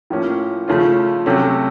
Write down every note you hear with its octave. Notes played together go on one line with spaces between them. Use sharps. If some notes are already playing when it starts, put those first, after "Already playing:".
A2 F3 A#3 C#4
C#3 F3 A3 C#4 F4
C3 F#3 A3 C#4 A4